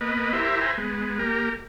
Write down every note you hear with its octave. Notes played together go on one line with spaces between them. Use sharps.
A#3 B3 B4 D#5
E4 G4 A#4 C5 E5
B4 C5 E5 G5 G#5 A#5
G#3 B3
A#3 G4 A#4